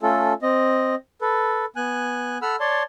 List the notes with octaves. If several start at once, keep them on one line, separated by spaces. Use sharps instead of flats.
A3 C#4 F4 A4
C4 D#5
A4 B4
B3 G#5 F#6
A4 F#5 B5 E6 F6
C#5 D5 A5 C6